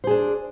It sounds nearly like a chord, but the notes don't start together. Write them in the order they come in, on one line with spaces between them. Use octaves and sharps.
C5 G#4 D4